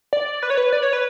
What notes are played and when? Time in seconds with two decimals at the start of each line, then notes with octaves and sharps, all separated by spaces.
0.13 D5
0.43 B4
0.50 C#5
0.57 B4
0.73 D5
0.83 C#5
0.93 B4